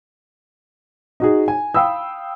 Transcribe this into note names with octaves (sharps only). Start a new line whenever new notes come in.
D#4 F#4 G#4
G#5
F5 G5 B5 D#6 E6